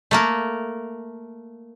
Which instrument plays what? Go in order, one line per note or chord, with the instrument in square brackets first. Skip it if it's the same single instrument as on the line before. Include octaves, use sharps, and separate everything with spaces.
[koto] A3 A#3 A#4